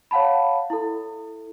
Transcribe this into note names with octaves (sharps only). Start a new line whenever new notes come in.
C#5 F5 F#5 A5 B5
E4 A4